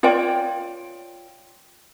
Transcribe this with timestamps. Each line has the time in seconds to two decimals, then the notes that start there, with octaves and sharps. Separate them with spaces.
0.03 F4 C#5 D5 G5